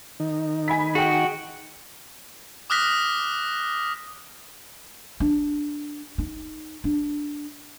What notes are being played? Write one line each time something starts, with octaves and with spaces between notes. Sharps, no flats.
D#3 D#4
G#5 B5 B6
F#4 G#4 G5
D6 D#6 F6 F#6 A#6 B6
D4
D#4
D4